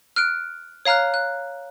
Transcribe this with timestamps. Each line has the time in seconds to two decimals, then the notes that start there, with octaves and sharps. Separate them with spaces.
0.16 F6 F#6 D7
0.85 C#5 F5 A#5 F6 F#6
1.14 F#6